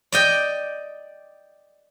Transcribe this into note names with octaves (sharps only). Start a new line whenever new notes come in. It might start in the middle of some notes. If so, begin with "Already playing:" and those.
D5 D#5 G5